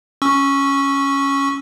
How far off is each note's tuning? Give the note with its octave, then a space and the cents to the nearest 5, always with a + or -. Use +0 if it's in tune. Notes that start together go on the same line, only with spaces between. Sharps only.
C#4 +0 C#6 +0 E6 +0